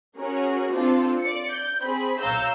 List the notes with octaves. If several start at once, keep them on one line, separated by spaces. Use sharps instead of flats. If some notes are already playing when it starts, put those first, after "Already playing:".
C#4 F#4 G#4 A#4
C4 D4 F4 A4
D5 C#7
G6
C4 G#4 B5
B1 C#5 F5 A#5 E6 G6